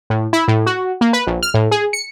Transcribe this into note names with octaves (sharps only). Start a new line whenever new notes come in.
A2
E4
A2
F#4
A#3
B4
A#1
F6
A2
G#4
C#7